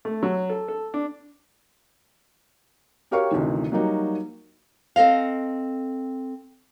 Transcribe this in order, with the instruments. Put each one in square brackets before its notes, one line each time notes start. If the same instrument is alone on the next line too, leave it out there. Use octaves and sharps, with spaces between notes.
[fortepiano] A3
F#3
A4
A4
D4
[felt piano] F#4 G4 A#4 C#5 F5 C#6
A1 D2 C3 D#3 E3
F#3 G3 A#3 D#4 F#4
[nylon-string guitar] C4 A4 D#5 F5